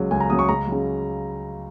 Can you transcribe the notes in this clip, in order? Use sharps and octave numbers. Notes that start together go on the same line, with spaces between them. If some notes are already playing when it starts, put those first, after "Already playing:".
Already playing: C#2 C#3 F#3
C#2 G#5
A#5
C#3 F#3 D#6
C#6
C#2 A#5
C#3 F#3